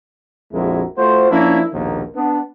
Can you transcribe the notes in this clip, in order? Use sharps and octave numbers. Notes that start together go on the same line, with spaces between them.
A#1 F2 G#3 E4 F#4 A#4
A3 F4 F#4 C5
F3 A#3 C#4 D4 E4
A#1 D#2 B2 A#3
B3 D4